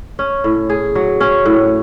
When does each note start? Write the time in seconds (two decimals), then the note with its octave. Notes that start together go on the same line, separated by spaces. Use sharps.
0.19 C#4
0.44 A2
0.70 G#4
0.95 F#3
1.20 C#4
1.46 A2